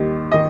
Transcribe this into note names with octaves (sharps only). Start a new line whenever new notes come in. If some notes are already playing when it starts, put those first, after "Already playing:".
Already playing: D#2 D#3 G3
D#3 D#5